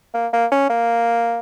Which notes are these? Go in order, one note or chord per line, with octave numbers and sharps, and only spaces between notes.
A#3
A#3
C#4
A#3